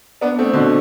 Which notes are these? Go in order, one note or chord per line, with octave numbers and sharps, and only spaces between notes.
B3 D4
A3 C4
B2 D3